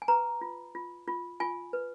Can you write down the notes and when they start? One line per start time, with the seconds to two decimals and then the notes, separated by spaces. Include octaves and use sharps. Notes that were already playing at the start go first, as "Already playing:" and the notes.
0.02 G#5
0.08 B4 A#5
0.41 F4
0.75 F4
1.08 F4
1.40 F4 G#5
1.73 B4